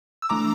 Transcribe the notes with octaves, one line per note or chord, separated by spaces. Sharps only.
E6
E3 A3 D4 A#5 D6